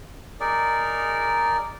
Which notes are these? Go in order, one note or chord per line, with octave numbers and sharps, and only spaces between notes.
D#4 G#4 A#4 D5